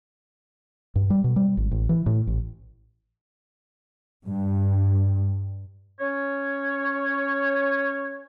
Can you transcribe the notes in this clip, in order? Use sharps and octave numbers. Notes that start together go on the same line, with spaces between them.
G2
G3
B2
G3
G#1
A1
E3
A2
A1
G2
C#4 C#5